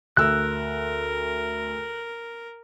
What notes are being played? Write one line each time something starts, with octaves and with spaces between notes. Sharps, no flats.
D2 A#4 E6 F#6